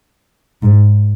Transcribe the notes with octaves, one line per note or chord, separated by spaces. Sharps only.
G#2